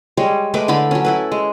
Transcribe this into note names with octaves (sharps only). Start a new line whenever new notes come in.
G3 G#3 C#5
G#3 A3 B4 D6
D3 E4 A5 B5
F#3 C#4
E4 A4 B4
G#3